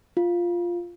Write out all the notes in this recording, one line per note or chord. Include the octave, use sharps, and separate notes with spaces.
F4